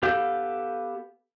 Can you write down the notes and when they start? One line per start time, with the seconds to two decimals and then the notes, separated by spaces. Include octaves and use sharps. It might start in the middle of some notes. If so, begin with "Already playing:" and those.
0.03 B3 G4 A4 F5 G6